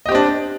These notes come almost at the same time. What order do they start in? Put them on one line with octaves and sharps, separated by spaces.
D#5 G4 C4 D4